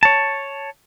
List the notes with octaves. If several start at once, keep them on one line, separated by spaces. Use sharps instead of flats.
C#5 A5